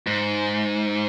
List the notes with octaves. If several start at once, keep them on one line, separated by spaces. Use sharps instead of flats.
G#2